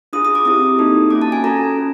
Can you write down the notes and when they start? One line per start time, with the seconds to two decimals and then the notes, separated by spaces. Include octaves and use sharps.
0.13 D4 F4 G#4 D#6
0.25 D#6
0.35 D6
0.45 C4 E4 G4 D#6
0.79 A#3 D#4 F#4 A4
1.11 A#3 C#4 F4 D6
1.22 A5
1.32 G#5
1.43 C#4 F#4 A4 A#5
1.76 C#4 F4